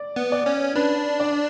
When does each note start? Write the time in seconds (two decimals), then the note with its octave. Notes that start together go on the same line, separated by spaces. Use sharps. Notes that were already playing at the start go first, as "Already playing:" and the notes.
Already playing: D5
0.16 B3
0.32 D5
0.46 C#4
0.76 D4 B4
1.20 D5